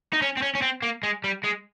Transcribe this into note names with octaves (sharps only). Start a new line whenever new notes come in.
D#4
C#4
C4
C#4
C#4
C4
A#3
G#3
G3
G#3